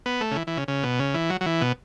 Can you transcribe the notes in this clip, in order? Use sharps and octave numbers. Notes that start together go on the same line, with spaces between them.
B3
A3
C#3
E3
E3
C#3
C#3
B2
C#3
E3
F#3
F#3
E3
B2